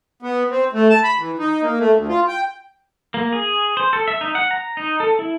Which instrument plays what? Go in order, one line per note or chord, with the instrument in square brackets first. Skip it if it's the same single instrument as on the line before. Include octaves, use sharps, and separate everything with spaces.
[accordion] B3
C4
A3
A5
B5
E3
D#4
A#3
A3
D2
F4
G5
[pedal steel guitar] A#3
G#4
C5
A4
E5
D#4
F#5
A#5
D#4
A4
E4